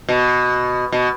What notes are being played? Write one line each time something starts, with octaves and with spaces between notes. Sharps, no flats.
B2
B2